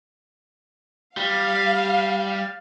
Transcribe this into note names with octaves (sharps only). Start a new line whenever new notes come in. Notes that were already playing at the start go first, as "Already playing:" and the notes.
G3 F5